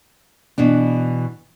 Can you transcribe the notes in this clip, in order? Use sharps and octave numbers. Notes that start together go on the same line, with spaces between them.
B2 E3 D4